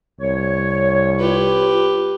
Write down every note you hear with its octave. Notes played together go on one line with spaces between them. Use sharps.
C2 C#5
F4 G4 B4